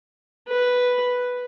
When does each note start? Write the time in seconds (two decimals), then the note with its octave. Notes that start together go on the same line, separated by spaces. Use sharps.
0.48 B4